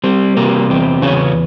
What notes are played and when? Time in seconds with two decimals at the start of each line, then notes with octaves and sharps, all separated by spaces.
0.04 G3 C4
0.37 C3 A#3
0.69 E2 C4
1.02 E2 C#3 C#4